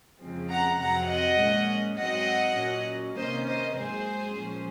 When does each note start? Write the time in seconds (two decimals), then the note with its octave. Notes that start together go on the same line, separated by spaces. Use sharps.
0.22 F2 C#3 F3 G#3 C4
0.51 F#5 A#5
0.80 F2 C3 F#3 C4 F#5 A#5
1.10 D#5 F#5
1.40 A#2 G#3 C#4
1.98 G#2 F#3 C4 D#5 F#5
2.57 A#2 F#3 C#4
3.16 C3 D#3 A#3 C#4 C5 D#5
3.47 C5 D#5
3.76 G#2 F#3 C4 G#4 C5
4.35 A#2 F3 G#3 C#4